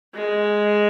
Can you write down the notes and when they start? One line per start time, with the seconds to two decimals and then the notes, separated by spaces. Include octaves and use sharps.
0.15 G#3